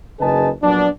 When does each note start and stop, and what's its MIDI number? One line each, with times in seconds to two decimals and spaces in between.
0.20 0.49 30
0.20 0.49 49
0.20 0.49 63
0.20 0.49 68
0.20 0.49 71
0.20 0.49 81
0.63 0.87 34
0.63 0.87 54
0.63 0.87 59
0.63 0.87 62